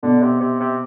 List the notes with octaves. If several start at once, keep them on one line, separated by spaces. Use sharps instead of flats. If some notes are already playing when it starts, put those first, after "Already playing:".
B2 D3
C3
C3
C3